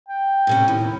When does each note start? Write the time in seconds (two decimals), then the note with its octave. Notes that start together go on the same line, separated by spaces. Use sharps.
0.08 G5
0.47 A2 C3 C#4
0.68 D#2 E4